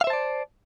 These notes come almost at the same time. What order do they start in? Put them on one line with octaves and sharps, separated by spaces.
F5 E5 C5 A5 D5